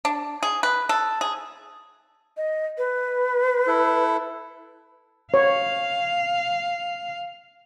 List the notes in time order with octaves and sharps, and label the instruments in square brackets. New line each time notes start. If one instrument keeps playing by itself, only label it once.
[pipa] D4
G#4
B4
A4
G#4
[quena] D#5
B4
[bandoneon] E4 A4
[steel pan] C#5 [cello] F5